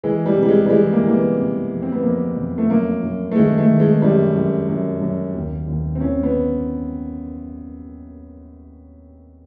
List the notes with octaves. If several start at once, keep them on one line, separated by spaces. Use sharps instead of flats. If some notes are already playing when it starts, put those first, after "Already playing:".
E3 G#3
G3
C3
G3
G#3
G3
E3 G#3
A#3
E3 A#3
B3
C3
F2
C4
B3
F2 A#3
F2
A3
F#2 A#3
F#2
A3
D#3 G#3
A3
D#3
G#3
F#2 G3
F#2
F#2
F#2
D#2
D#2
C4
D#2 C#4
B3